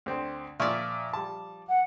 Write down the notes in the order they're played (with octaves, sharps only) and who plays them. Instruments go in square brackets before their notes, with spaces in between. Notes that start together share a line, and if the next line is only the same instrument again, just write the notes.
[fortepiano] D2 C4
[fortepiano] A#2 E5 C#6 [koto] F3 D5
[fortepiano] G3 A5
[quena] F#5